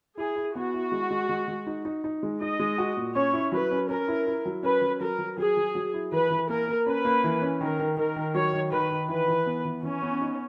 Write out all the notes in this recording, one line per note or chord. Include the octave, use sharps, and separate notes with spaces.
E4 G#4
E4
B3 F#4
E4
G#3
G#3
G#3
G#3
D#4
D#4
D#4
G#3
D#4 D#5
G#3
F#4
A#2
C#4 C#5
E4
F#3 B4
C#4
C#4 A#4
E4
E4
F#3
C#4 B4
F#3
F#3 A#4
F#3
F#3 G#4
F#3
F#3
E4
E3 B4
E3
A#3 A#4
A#3
C#4 B4
A#3
E3
C#4
D#3 A#4
D#3
D#3 A#4
D#3
F#3 C#5
D#3
D#3 B4
D#3
E3 B4
E3
B3
E3
E3 C#4
B3
D#4